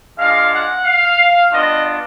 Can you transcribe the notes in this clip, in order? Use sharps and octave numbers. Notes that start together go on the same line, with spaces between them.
G#3 D4 F4 F5
F#5
F5
B3 D4 F4 D#5